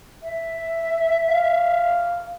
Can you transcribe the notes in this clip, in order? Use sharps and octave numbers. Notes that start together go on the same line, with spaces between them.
E5
F5